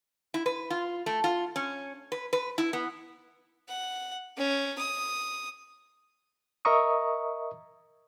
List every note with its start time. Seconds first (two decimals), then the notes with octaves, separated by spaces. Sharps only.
0.34 E4
0.46 B4
0.70 F4
1.06 A3
1.24 F4
1.56 C#4
2.12 B4
2.33 B4
2.58 E4
2.73 B3
3.68 F#5
4.37 C#4
4.78 D#6
6.65 A#4 D#5 E5 A#5 C#6 D#6